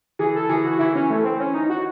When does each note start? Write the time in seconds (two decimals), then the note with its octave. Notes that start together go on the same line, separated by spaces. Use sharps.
0.19 E3 G#4
0.35 A4
0.49 E3 G#4
0.65 F#4
0.79 E3 E4
0.95 C#4
1.10 A3
1.24 C4
1.40 C#4
1.54 D#4
1.70 F#4